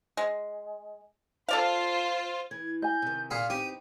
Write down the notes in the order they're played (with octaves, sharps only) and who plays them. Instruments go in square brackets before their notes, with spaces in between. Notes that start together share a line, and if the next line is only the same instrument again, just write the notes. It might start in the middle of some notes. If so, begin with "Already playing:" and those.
[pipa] G#3
[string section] F4 C5 [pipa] A4 D5 F5
[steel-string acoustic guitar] E3 [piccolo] G#6
[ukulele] D#5 G#5 [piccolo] G6
[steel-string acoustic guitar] C3 D#3
[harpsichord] A#2 G#4 [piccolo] F6
[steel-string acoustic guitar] B3 C4 D#4 [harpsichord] G4 [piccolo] D#7